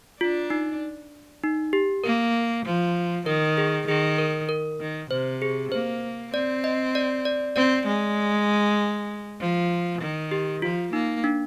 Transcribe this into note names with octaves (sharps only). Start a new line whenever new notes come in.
D4 F4
D#4
D#4
G4
A#3 A#4
F3
D#3 A#4
G#4
D#3 G#4
A#4
A#4
D#3
C3 C5
G#4
A#3 C5
C4 D5
D#5
D5
D5
C4 D5
G#3
F3
D#3
G4
F3 F4
A#3 D#4
D4